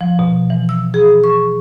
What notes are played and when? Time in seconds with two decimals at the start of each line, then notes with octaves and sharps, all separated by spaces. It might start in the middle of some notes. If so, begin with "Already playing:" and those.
0.01 F3
0.19 B2
0.50 E3
0.69 E6
0.94 G#4
1.24 C#6